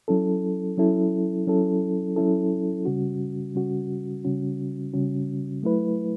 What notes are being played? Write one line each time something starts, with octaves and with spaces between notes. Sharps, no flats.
F#3 C#4 E4 A4
F#3 C#4 E4 A4
F#3 C#4 E4 A4
F#3 C#4 E4 A4
C#3 G3 C#4 F#4
C#3 G3 C#4 F#4
C#3 G3 C#4 F#4
C#3 G3 C#4 F#4
F#3 A3 E4 B4